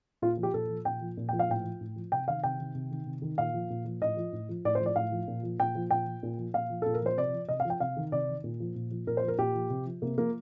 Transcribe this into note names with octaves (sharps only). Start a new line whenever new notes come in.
A#2 F4
F3
G4
A#2 A4
F3
A#2 G5
F3
A#2
F3 G5
F5
A2 G5
F3
A2
F3
C3 G5
D#3 F5
C3 G5
D#3
C3
D#3
C3
D#3
A#2 F5
F3
A#2
F3
A2 D#5
F3
A2
F3
A2 D5
C5
F3
D5
A2 F5
F3
A#2
F3
A#2 G5
F3
A#2 G5
F3
A#2
F3
A#2 F5
F3
A#2 A4
A#4
F3 C5
C3 D5
F3
C3 D#5
F5
F3
G5
C3 F5
D#3
C3 D5
D#3
A#2
F3
A#2
F3
A#2 A#4
C5
F3 A#4
A#2 G4
F3
C3
F3
C3 A#3
F3 A#3